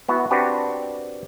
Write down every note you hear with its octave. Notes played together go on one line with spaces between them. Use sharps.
B3 E4 F#4
C4 D4 F#4 G4 B4